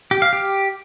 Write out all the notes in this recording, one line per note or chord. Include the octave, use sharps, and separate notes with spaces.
G4
F5
G4